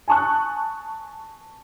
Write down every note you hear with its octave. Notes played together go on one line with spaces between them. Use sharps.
G#5 A5 C#6 D#6 F#6